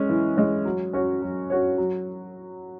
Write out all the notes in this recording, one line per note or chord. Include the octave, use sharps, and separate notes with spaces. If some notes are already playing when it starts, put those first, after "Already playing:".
Already playing: G#3 C#4
E3
G#3 C#4
F#3
C#4 F#4 C#5
F#3
C#4 F#4 C#5
F#3